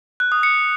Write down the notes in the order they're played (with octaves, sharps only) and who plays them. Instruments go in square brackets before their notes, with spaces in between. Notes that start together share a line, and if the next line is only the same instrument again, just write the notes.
[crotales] F#6
D#6
C#7